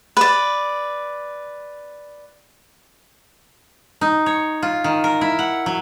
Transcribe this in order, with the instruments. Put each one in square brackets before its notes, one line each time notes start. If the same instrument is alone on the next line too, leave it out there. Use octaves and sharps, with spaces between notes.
[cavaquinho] B4 D5
[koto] D#4
C#5
F4
D#3
A#4
E4
F#5
F#3